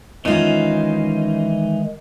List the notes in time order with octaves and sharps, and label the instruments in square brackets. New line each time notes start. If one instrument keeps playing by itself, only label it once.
[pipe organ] D#3 G#3 [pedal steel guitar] E3 D#4 [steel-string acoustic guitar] C#4 F4